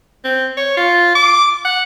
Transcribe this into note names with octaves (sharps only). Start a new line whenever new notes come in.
C4
C#5
F4
D6
F#5